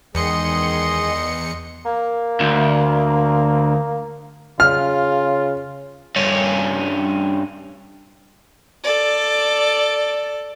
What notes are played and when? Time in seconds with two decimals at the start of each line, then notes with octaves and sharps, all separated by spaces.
0.15 E2 D#3 G#3 G#4 D#5 C6 C#7
1.85 A#3
2.40 D2
4.60 C#3 F4 F6
6.16 G2 C#4
8.84 A4 D5